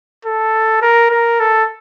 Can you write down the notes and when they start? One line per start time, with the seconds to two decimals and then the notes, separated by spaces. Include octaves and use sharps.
0.25 A4
0.82 A#4
1.11 A#4
1.40 A4